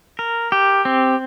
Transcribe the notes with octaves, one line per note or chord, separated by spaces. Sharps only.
A#4
G4
C4